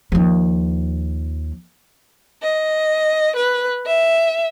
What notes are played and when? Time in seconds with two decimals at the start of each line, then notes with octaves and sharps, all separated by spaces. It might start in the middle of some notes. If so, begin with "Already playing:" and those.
0.12 D#2 F3
2.43 D#5
3.36 B4
3.87 E5